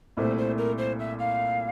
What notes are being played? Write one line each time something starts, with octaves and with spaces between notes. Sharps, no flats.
C2 A#2 A3 E4 C5
C5
A#4
C5
E5
F5